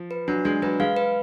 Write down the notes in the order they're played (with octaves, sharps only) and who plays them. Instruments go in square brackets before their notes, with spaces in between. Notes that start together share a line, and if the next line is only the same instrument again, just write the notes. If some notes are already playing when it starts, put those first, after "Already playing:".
Already playing: [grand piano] F3
[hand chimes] B4
[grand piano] F#3 [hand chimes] D4
[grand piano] G#3 [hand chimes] D4
[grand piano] F#3 [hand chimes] B4
[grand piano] G#3 [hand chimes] F5
[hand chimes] B4